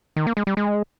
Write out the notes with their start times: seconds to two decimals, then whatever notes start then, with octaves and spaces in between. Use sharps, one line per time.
0.16 D#3
0.27 A#3
0.37 G#3
0.47 G3
0.57 G#3